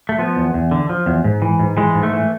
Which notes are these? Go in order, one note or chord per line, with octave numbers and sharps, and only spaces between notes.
A3
F3 B3
E2
E2
D3
F3
E2
G#2
E3
G#2
E3 G#3
G#2
A3
E3